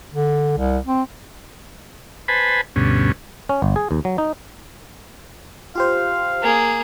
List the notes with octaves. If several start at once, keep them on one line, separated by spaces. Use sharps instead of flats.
D3
C2
C4
B4 C5 G#5 A5 B5
D2 G2 B2 C#4
C#4
G1
G#4
D#2
F#3
D#4
F4 G4 C5 F5
A#3 G#4